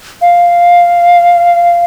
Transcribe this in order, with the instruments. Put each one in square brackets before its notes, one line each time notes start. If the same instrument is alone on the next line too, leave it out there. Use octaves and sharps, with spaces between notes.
[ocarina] F5